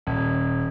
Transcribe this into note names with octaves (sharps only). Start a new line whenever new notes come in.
D#1